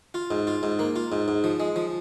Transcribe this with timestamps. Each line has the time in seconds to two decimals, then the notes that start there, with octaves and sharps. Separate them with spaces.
0.14 F4
0.31 G#2
0.47 F4
0.63 G#2
0.79 A#3
0.96 F4
1.12 G#2
1.28 G#2
1.44 F3
1.60 G#3
1.76 F3